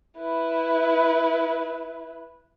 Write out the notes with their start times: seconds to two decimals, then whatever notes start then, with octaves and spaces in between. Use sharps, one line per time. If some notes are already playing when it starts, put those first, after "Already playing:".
0.18 E4 B4